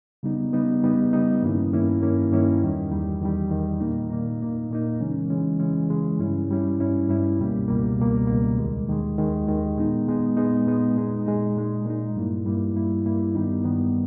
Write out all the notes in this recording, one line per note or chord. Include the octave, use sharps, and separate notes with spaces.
C#3 G3 B3 D#4
C#3 G3 B3 D#4
C#3 G3 B3 D#4
C#3 G3 B3 D#4
G2 D#3 A#3 C#4 E4
G2 D#3 A#3 C#4 E4
G2 D#3 A#3 C#4 E4
G2 D#3 A#3 C#4 E4
E2 D#3 G3
E2 D#3 G3
E2 D#3 G3
E2 D#3 G3
A#2 A#3 D#4
A#2 A#3 D#4
A#2 A#3 D#4
A#2 A#3 D#4
C#3 E3 G#3 C#4
C#3 E3 G#3 C#4
C#3 E3 G#3 C#4
C#3 E3 G#3 C#4
G2 G3 C#4 E4
G2 G3 C#4 E4
G2 G3 C#4 E4
G2 G3 C#4 E4
C#2 B2 G3 A#3
C#2 B2 G3 A#3
C#2 B2 G3 A#3
C#2 B2 G3 A#3
D#2 D#3 G#3
D#2 D#3 G#3
D#2 D#3 G#3
D#2 D#3 G#3
A#2 G#3 B3 D#4
A#2 G#3 B3 D#4
A#2 G#3 B3 D#4
A#2 G#3 B3 D#4
A#2 G#3 D#4
A#2 G#3 D#4
A#2 G#3 D#4
A#2 G#3 D#4
G2 G3 A#3 E4
G2 G3 A#3 E4
G2 G3 A#3 E4
G2 G3 A#3 E4
G2 D#3 G3 B3 D#4
G2 D#3 G3 B3 D#4